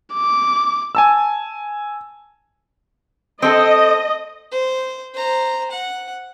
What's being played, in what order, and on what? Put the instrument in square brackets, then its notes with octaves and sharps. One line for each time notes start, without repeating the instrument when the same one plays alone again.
[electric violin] D6
[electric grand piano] G#5 A5 E6
[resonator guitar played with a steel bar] C4 A4 [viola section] D#5
[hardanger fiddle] C5
C5 A#5
F#5